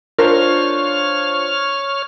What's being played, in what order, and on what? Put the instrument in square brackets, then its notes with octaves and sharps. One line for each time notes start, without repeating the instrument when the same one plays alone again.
[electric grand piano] D4 F4 C5 [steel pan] A#4 [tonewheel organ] C#5 F6